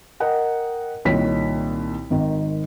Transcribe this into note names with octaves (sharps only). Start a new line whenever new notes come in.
A#4 D#5 F#5 G5
C2 A#2 D#3 C#5 B6
G#1 D#3